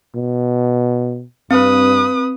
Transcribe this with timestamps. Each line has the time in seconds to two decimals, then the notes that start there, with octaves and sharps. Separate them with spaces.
0.15 B2
1.51 G2 C4 B4 D#6